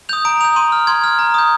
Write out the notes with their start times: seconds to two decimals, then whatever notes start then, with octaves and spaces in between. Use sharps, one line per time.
0.09 D#6 G6 F7
0.25 A#5 D7
0.41 D#6 G6 F7
0.56 C6 D#7
0.72 F6
0.87 C6 G#6
1.04 F6
1.19 A#5
1.34 D#6 G6